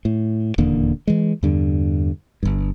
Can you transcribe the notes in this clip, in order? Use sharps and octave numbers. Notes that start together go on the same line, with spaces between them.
A2
D#1 E2 D3 A#3
E3 G#3
E2 G2 D3
G1 G2